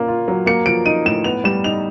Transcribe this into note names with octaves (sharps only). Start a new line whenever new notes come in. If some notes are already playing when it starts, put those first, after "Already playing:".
Already playing: A#2 A#3 C#4
F4
F#3
A#3 C#7
F3 D7
D#4 D#7
A2 E7
B3 F7
G3 E7
D#4 F7